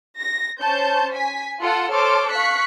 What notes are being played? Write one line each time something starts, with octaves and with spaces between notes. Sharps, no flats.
A#6
C#4 C5 A5 G6
G#5 B6
F4 A4 F#5
A4 C5 C#5 C6 D6 F6
F5 C#6 F#6 B6 C#7